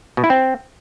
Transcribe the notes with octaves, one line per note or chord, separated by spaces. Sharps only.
B2
E4
C4